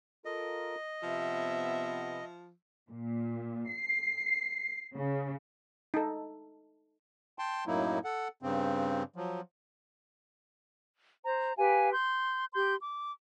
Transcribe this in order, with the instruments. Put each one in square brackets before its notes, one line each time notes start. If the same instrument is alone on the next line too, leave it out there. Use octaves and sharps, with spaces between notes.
[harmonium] F4 A4 A#4 [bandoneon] D#5
[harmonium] C3 B3 [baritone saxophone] F3 [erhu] E5
[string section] A#2
C7
C#3
[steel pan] D#4 A4
[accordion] G5 A5 C6
F#2 A2 F#3 A#3 D#4 E4
A4 F#5
G2 C#3 C4
F3 F#3
[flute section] C5 A#5
G4 B4 F5 G#5
C6 G6
G4 C6 G6
D6